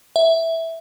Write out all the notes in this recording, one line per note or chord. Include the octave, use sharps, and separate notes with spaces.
E5